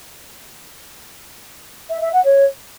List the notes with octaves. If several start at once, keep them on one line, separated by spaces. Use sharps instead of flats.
E5
E5
F#5
C#5